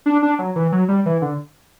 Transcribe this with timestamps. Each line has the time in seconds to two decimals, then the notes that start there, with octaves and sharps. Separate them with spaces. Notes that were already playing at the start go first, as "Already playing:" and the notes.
0.06 D4
0.23 D4
0.39 F#3
0.56 E3
0.72 F#3
0.89 G3
1.06 E3
1.22 D3